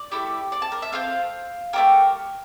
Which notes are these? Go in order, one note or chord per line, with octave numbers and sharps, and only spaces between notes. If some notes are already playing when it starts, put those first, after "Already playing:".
Already playing: D5
A3 E4 G4
D5
A5
A#4
E5
C4 F4 A4 F5
A3 D4 G4 A#4